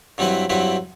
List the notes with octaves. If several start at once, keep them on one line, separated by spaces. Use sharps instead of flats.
G2 F#3 C4 E4 B4
G2 F#3 C4 E4 B4